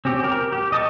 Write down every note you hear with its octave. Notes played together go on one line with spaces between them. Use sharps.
C4 C#4 G4
G4 A#4
A#4
G4
D#5 A5 C#6